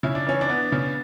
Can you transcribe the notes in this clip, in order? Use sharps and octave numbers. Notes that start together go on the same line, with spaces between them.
C#3 E4
D4
E3 C#4
D4
B3
C#3